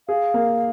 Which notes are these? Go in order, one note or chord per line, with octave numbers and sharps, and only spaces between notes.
G#4 F5
A#3